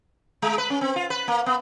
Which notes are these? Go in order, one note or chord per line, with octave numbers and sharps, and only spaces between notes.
G#3
B4
C#4
C4
F4
B4
A#3
B3